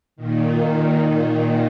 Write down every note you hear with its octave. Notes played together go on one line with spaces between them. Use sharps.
A#2 D#3